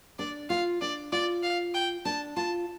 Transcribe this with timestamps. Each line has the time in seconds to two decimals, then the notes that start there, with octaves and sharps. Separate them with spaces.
0.19 D4 D5
0.50 F4 F5
0.81 D4 D5
1.12 F4 D5
1.43 F5
1.74 G5
2.05 D4 A5
2.37 F4 A5